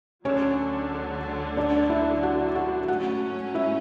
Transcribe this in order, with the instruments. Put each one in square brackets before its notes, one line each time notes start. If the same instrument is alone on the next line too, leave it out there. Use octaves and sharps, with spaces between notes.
[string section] D2 D3 F#3 [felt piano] C#4 C#5
[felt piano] D4 D5
E4 E5
F#4 F#5
F#4 F#5
[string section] G#2 F#3 A3 C#4 [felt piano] F#4 F#5
[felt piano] E4 E5